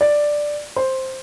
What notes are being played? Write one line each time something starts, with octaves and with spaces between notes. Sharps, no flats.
D5
C5